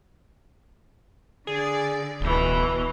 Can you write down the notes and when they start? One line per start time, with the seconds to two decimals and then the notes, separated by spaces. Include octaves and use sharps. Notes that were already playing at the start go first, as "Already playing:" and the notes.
1.47 D3 G#4 D5
2.20 D1 B2 E3